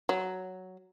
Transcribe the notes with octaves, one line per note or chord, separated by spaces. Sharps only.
F#3